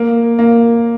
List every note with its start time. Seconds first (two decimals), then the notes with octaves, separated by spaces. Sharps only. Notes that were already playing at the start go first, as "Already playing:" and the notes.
Already playing: A#3
0.39 A#3